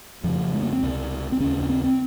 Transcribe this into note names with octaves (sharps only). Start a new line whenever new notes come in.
F2 C#3 F3
G#3
A#3
C4
C#2 C3
C4
D#2 C#3 C#4
C#4
C4
C4